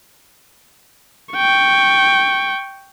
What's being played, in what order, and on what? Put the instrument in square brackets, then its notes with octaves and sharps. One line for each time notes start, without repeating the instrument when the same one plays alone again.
[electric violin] G5 C#6